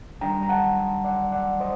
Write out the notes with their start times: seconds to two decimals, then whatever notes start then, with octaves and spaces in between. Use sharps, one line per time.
0.21 D#3 G3 D4 G5 A#5
0.43 A#5
0.49 F#5 A5
1.04 D5 F#5
1.32 D5 F#5
1.60 C5 D#5